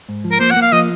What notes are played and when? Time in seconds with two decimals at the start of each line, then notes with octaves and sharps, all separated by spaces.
0.09 G#2
0.24 F3
0.31 A#4
0.40 A#3 C5
0.51 F#5
0.56 A#3
0.62 F5
0.72 F3 D#5